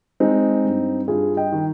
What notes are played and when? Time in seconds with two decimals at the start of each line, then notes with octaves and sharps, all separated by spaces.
0.20 G#3 C4 D#4
0.64 G2
1.08 G2 F4 G#4
1.37 D#5 G5
1.52 D#3